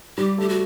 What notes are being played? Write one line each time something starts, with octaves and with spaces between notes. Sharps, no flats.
G3 G4
A3 G4
F#4